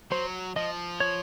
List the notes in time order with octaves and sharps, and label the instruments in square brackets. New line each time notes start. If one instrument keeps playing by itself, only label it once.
[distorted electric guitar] F#3 [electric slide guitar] C5
[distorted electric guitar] F3 [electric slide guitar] D#5
[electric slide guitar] C#5